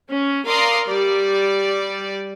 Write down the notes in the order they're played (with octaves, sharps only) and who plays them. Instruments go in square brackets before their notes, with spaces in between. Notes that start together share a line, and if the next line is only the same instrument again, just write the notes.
[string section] C#4
A#4 D5 F5 A#5 C6 D#6
G3 D5